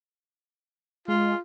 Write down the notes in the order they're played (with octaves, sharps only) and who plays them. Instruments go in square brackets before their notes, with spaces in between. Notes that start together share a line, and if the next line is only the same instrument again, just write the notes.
[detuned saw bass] G#3 [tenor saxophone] F4